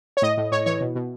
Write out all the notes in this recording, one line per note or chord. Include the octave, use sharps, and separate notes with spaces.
C#5
A2 D#5
A2
A2 C#5
E3 C#5
B2
B2